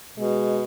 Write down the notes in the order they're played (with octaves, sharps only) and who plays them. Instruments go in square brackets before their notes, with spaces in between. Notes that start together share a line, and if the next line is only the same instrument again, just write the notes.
[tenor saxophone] B2 [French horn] G#3